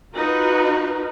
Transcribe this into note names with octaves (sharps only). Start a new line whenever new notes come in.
D#4 F4 F#4 A#4 B4